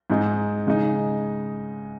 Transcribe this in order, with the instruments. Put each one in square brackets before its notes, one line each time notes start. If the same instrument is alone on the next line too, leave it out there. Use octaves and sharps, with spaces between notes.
[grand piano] G#2 G#3 D#4
C#3 G#3 D#4